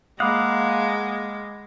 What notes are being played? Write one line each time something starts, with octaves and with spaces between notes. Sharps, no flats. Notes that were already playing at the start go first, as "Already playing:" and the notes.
G#3 A#3 F5 F#5 B5 D6 D#6